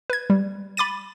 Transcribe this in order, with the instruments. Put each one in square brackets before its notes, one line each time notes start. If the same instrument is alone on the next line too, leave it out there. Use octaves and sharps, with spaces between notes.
[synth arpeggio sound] B4 G#6
G3
B5 D6 A6 D#7